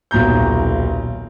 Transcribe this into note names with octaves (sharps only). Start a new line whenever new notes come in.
D#1 B1 A#5 G6